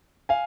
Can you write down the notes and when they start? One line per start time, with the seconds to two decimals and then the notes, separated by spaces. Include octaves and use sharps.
0.29 F5 G#5